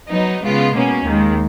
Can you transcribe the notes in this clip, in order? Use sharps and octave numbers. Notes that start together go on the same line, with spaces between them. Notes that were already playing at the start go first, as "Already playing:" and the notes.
F#3 B3 D#4
C#3 G#3 B3 F4
B2 A#3 C#4
D#2 D#3 G#3